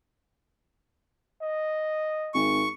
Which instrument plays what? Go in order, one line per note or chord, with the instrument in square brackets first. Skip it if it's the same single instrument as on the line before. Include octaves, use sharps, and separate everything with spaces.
[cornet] D#5
[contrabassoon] G#1 [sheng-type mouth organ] C#6